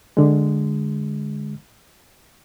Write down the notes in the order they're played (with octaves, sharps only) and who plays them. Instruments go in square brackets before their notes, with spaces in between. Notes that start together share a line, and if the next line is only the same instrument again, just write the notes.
[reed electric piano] D3 G#3